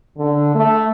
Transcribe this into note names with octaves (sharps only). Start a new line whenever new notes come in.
D3
A3